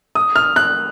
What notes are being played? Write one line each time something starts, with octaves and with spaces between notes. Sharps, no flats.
D#6
F6
F#6